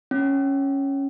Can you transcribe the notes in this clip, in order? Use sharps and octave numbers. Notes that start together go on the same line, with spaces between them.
C#4